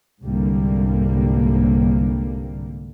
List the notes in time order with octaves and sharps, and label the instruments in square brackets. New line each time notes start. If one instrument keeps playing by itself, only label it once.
[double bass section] C2 G#2 D3 G3 A#3